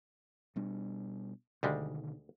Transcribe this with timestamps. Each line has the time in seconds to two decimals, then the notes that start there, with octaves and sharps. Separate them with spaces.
0.56 B2 G3 D4
1.63 D2 B2 D3 D#3 G3 G#3